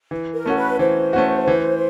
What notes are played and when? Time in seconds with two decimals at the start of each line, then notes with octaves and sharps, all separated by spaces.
0.11 E3
0.34 A#4
0.46 A3 C#4 F#4
0.56 B4
0.79 E3 C5
1.13 A3 C#4 F#4
1.48 E3